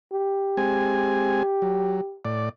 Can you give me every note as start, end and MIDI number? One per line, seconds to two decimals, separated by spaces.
0.13 2.18 67
0.57 1.43 56
0.57 1.43 60
0.57 1.43 80
1.62 2.01 54
2.25 2.49 45
2.25 2.49 74